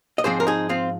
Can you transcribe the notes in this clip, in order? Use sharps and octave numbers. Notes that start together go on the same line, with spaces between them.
D#5
G#2 F3 C4 G#4 C5
A#4
D#4 G#4
C4 F4